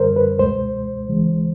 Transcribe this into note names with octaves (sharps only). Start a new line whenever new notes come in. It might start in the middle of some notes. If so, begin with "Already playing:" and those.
Already playing: F#2 D3 G3 A#4 C5
B4
C#2 B2 G#3 C5
C#2 C#3 E3 G#3